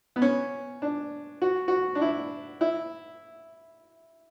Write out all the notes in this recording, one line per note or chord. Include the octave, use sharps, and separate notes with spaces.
B3
C#4
D4
F#4
F#4
D4
E4
E4